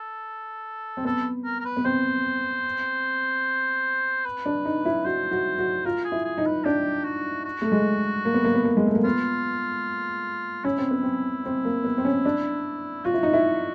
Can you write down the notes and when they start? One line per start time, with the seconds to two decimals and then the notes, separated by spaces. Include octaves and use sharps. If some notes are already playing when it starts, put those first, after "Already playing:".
Already playing: A4
0.97 C4
1.05 B3 A4
1.45 A#4
1.60 A#4
1.65 B4
1.77 B3
1.85 C4 C5
4.25 B4
4.46 D4
4.65 D#4
4.85 E4
5.05 F#4 C5
5.31 F#4
5.59 F#4
5.85 F4 A#4
6.05 G#4
6.12 E4
6.25 G#4
6.38 D#4
6.46 B4
6.65 D4 G4
7.04 F#4
7.45 F#4
7.62 A3
7.72 G#3
8.25 A#3
8.34 B3
8.44 A#3
8.55 B3
8.64 A#3
8.77 G#3
8.86 A3
8.95 A#3
9.04 B3 F4
10.64 C#4 E4
10.78 C4
10.91 B3
11.03 C4
11.45 C4
11.65 A#3
11.84 B3
11.98 C4
12.05 C#4
12.25 D4
13.04 F4 F#4
13.14 E4
13.23 D#4
13.33 E4